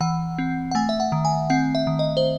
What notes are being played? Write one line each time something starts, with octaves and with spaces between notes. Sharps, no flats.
E3 F#5
C4
F#5
A3 G#5
E5
F#5
D#3
G#5
C4 F#5
E5
D#3
D#5
C5